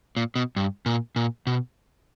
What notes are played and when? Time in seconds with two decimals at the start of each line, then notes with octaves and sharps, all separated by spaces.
0.16 A#2
0.35 B2
0.56 G2
0.86 A#2
1.16 A#2
1.47 B2